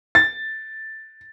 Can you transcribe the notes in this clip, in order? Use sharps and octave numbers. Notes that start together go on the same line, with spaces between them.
A6